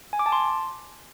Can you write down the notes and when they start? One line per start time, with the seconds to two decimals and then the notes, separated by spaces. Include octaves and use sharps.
0.13 G#5
0.19 D6
0.26 A5
0.32 C6